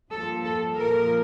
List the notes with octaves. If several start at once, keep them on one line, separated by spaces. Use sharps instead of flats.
G2 F3 A#3 A4
A4
A#2 F3 A#3 A#4